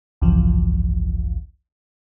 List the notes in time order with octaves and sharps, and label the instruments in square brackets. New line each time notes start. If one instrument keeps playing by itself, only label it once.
[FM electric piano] G#1 C#2 F#2 E3 F3